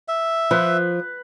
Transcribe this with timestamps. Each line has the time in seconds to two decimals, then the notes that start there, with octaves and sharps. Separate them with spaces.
0.08 E5
0.51 F3 B4